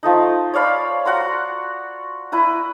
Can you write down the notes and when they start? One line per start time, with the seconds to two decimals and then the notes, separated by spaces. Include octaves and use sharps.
0.03 F3 A3 D#4
0.54 C#5 D5 F5 B5
1.05 F#4 F#5 A#5 C6
2.32 E4 B4 A#5